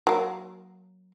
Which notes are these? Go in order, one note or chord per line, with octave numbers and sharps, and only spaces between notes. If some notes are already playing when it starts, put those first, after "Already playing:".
F#3 A#3